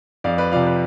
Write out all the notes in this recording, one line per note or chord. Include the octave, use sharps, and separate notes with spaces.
F2 D5 F5
B4 D5
C3 F3 D5 F5
B4